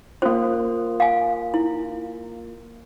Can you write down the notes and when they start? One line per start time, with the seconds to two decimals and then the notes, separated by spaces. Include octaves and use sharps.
0.22 A#3 C#4 F4 C5
1.00 F5 G#5
1.54 E4